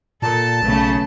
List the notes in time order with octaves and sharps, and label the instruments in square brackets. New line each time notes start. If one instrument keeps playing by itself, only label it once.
[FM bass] A#2 [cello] A4 [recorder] A5
[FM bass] B1 [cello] C#3 A3